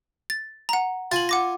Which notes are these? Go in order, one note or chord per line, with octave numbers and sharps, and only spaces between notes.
A6
F#5 A#5
F4 G#5 A6 F#7
F#5 D6 A#6